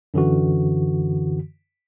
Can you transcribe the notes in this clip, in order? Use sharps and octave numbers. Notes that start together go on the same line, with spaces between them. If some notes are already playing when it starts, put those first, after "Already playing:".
F#2 D3 E3 F#4